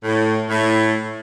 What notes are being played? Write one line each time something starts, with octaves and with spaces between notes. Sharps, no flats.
A2
A2